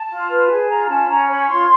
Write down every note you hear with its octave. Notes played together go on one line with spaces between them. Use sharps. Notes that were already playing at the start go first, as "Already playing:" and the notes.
Already playing: A5
F4
B4
G#4
F4 A#5
C#4 A5
B5
C#4 A#5
C#5 B5
F4 C6